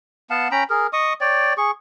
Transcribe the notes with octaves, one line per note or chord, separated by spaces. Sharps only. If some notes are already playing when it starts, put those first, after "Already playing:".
B3 F5 F#5 A5
C#4 G5 A#5 B5
G#4 A#4
D#5 C#6 D#6
C#5 D5 G5
G#4 C#6